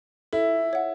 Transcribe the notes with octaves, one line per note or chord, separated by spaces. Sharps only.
E4 A4
C#5 F#5